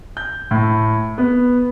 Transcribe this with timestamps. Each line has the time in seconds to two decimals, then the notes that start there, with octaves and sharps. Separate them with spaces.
0.17 G6
0.51 A2
1.18 B3